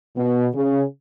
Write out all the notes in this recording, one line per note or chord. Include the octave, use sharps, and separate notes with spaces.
B2
C#3